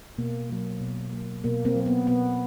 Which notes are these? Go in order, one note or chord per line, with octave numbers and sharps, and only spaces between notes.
B2 A#3
F#3 A#3
B2
F#3 A#3
B2 A#3
A#3 C4
F#3 A#3
B3
B2 B3